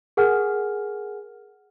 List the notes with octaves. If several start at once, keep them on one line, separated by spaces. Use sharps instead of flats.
G#4 A#4 F#5 G#5 F6